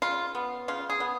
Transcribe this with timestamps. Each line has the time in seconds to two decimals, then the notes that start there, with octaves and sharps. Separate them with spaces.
0.02 C#3 F4
0.35 B3
0.68 C#3 F4
0.90 G#4
1.00 B3